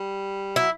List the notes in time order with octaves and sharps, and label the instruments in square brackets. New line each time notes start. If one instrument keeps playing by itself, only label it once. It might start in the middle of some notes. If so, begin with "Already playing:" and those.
Already playing: [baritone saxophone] G3
[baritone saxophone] F#3 [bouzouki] E4